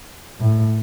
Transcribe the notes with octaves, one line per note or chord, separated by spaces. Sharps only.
A2